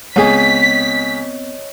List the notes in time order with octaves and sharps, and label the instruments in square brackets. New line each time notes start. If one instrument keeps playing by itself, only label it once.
[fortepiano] C#2 G#4 [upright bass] B3 C4 [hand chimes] C#5 D#5 [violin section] B6